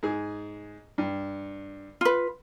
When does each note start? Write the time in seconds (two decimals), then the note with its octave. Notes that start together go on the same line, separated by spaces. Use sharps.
0.03 G#2 G#4
0.98 G2
2.01 F4 B4